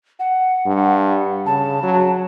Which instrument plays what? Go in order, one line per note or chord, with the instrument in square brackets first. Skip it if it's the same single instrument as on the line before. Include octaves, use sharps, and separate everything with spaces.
[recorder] F#5
[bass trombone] G2
[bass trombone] C#3 [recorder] A5
[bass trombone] F#3